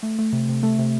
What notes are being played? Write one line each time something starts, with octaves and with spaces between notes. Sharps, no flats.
A3
A3
C3
C3
A3
C3